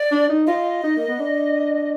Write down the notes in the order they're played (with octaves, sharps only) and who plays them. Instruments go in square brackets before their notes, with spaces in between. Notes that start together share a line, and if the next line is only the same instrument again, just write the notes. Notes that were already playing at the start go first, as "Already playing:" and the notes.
Already playing: [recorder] D5
[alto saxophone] D4
D#4
[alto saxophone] F4 [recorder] D#5
[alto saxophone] D#4
A#3
B3
D4